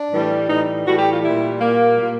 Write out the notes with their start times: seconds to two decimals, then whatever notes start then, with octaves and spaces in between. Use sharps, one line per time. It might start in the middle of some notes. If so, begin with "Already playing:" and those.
Already playing: D4
0.11 A2 E3 G3
0.48 A2 E3 G3 D#4
0.85 A2 E3 G3 F#4
0.97 G4
1.09 F4
1.22 A#2 G3 E4
1.59 A#2 G3 A#3
1.96 A#2 G3